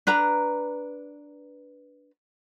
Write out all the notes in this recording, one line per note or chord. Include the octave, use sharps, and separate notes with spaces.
D4 B4 A#5